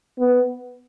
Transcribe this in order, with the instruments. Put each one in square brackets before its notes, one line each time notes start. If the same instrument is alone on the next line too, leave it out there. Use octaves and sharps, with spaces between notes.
[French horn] B3